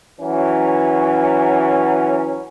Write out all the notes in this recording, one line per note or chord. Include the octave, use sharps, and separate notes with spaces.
E3 F#3 C#4